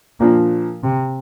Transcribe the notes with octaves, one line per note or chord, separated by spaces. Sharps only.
A#2 F3 A#3 D4
C3